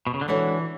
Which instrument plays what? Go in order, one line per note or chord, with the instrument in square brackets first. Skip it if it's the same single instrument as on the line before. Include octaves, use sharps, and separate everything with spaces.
[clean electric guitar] B2
C#3
D3
[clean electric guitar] E3 [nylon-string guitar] G#3 D4 F#4 A4 C#5